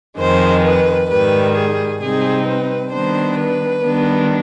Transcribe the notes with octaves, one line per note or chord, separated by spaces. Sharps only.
F2 D#3 G#3 C5
B4
G#2 D#3 G3 B4
G#4
C3 G3 C4 D#4 G#4
B4
D#3 G3 B3 D4 C5
B4
D#3 G3 B3 D4